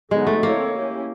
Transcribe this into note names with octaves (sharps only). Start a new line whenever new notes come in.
D3 F#3 G#3 B3 D#4 F#4
A3
A#3 C4 E4 A4 C#5
C#4 E4 G4